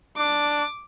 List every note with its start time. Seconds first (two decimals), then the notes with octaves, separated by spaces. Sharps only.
0.18 D4 D6